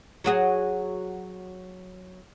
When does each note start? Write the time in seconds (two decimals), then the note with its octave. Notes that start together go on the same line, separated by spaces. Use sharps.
0.24 F#3 F#4 G#4